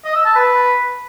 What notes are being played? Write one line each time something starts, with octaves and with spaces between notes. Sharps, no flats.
D#5
E6
A5
B4